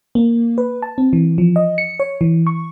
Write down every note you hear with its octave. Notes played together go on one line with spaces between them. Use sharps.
A#3
B4
A5
C4
E3
F3
D#5
C#7
C#5
E3
C#6